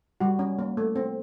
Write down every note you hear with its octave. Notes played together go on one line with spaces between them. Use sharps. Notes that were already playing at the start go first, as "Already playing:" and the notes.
G3 F#4
C#4
A#3
A3
C4